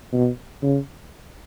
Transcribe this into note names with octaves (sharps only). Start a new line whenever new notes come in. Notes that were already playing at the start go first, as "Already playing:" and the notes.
B2
C#3